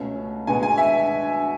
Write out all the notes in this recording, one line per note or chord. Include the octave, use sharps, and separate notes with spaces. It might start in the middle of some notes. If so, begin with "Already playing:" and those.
Already playing: C#2 B2 A3 C#4
B2 G#3 B3 G#5
G#5
E5